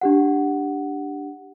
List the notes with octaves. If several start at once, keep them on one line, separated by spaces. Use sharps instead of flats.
D4 G4 F#5